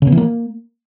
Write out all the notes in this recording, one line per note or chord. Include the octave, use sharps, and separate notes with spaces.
C#3
B3
E3
A#3